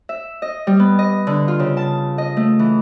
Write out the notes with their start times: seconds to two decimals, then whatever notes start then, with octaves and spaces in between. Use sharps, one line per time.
0.09 E5
0.42 D#5
0.67 G3
0.80 B3
0.99 D#5
1.27 D3
1.48 F4
1.60 C#3
1.77 A5
2.18 D#5
2.37 A3
2.59 E3